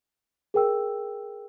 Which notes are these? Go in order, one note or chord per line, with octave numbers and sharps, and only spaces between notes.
G#4 A#4 G5 E6